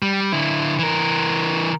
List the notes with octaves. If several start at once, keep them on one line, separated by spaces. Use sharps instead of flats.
G3
D3 E4
E3 A#4